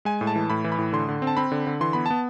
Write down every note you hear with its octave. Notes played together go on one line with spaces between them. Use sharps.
G#3 G#5
A2
A5
E3
A2 B5
E3
B5
A2
D3 C6
D3
C4
A5
C4 B5
D3
D3
E3 C6
B3 B5
B3 A5